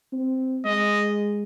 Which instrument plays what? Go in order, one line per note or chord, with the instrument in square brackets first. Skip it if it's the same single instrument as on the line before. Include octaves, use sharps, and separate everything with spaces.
[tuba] C4
[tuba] G#3 [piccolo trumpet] D#5